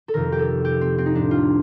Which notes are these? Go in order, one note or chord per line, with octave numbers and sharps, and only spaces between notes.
A4
F2 C3 D#3 A#4
G4
A4
G4
C4
C4
D#4
A2 F3 D4
F4